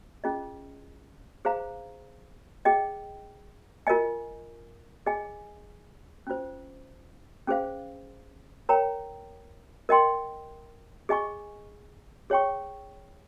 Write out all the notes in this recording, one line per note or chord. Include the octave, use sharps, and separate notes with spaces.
C#4 F4 G#4 D#5
G#4 C5 F5 A#5
G#4 D#5 G5
F4 A#4 D#5 G#5
G#4 D#5 G#5
C#4 F4 C5
C#4 G#4 C5 F5
A#4 C#5 G5 A#5
A#4 D#5 G5 C6
G#4 D#5 G#5 C#6
G#4 C#5 G5 C#6